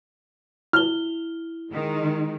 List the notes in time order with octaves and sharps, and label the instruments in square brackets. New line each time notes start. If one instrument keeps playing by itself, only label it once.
[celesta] E4 G7 [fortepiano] F6
[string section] D#3 G#3